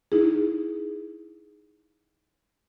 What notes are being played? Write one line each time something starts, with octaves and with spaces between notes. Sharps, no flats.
D#4 E4 G#4